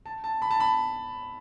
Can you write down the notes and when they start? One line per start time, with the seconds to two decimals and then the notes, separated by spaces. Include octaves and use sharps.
0.06 A5
0.24 A5
0.42 B5
0.51 A5
0.60 B5